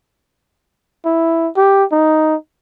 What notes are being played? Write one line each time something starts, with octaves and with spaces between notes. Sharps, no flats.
E4
G4
D#4